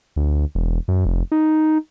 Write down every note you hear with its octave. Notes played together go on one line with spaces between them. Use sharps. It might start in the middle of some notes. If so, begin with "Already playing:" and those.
D2
E1
F#2
F1
D#4